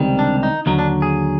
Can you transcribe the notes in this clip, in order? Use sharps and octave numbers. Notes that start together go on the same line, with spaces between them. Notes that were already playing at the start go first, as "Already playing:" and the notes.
Already playing: C#2 C3 D#3 G3
D4
D#4
D#2 D3 F#3 D#4
D4
G#4